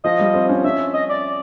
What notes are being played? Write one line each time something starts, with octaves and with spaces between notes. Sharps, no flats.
F3 D#5
G3
C4
C#4
C#4 E5
D#5
D5